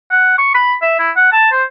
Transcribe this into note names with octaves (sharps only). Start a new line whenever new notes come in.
F#5
C#6
B5
E5
E4
F#5
A5
C5